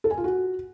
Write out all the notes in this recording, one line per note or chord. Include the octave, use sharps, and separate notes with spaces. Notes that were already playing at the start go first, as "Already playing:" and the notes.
A4
G#5
F4
F#4